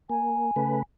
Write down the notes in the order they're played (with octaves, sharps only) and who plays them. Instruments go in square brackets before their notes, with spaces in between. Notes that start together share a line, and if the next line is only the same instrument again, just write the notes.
[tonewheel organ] A#3 [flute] G#5
[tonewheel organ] C#3 A3 B4